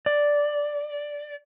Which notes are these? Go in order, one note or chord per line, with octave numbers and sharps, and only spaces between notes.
D5